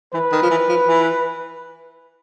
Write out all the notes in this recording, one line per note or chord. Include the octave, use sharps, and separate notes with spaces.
E3 B4
D#3
F3
E3
F3
E3